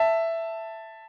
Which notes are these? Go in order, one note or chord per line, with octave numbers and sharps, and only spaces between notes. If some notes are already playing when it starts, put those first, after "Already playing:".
Already playing: E5 A5